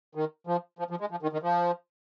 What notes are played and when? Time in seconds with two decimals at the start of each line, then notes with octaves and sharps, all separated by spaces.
0.15 D#3
0.47 F3
0.79 F3
0.91 F3
1.01 G#3
1.11 F3
1.22 D#3
1.33 D#3
1.43 F3